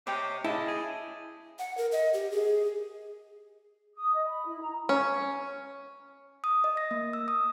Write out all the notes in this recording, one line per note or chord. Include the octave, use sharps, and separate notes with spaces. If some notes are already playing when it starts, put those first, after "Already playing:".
C3 C#5 D#5 G5 D6
C#3 E4 D#5 A5
G#4
F#5
A#4
D#5
G4
G#4
D#6
D#5
B5
E4
A#5
C#4
D#6
D#5
A#6
A#3
E6
D#6